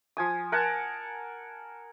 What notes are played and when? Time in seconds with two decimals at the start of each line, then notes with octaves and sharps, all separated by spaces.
0.17 F3 G#5 D#6
0.52 A#4 F#5 G#5 A5